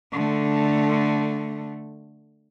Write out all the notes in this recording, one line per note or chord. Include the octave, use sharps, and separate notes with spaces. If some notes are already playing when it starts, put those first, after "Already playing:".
D3 A3